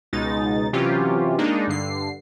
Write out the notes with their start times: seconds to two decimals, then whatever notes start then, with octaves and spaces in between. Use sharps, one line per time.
0.13 C#2 B2 G#3 D#4 A6
0.73 C3 E3 F#3 C#4 F4 G4
1.38 G#3 A#3 D4 D#4
1.67 G2 D3 C7